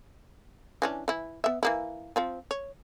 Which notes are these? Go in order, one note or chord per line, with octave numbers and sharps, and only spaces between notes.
E3 C#4 D4
E3 E4
B3 E5
E3 A#3 E4
F3 C4 F4
C#5